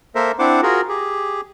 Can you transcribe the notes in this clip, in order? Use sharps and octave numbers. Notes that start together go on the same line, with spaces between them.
A#3 A4 A#4 C5 E5
C4 D4 E4 C5 F#5 D6
F4 F#4 G#4 A#4
G4 G#4